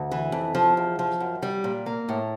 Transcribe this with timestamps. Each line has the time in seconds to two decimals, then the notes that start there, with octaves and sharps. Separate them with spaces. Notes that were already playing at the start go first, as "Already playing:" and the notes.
Already playing: D2
0.12 E3
0.32 F2
0.55 F3
0.77 E2
0.99 F3
1.20 F#2
1.43 G3
1.64 A#2
1.86 A#3
2.09 A2